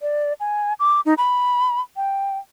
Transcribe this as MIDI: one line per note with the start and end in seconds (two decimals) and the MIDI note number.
0.02 0.33 74
0.40 0.73 80
0.80 1.01 86
1.06 1.14 63
1.18 1.81 83
1.96 2.38 79